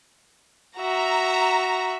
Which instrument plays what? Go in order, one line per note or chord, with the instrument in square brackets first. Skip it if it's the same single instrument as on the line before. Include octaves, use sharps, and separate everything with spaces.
[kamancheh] F#4 E5 [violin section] A#5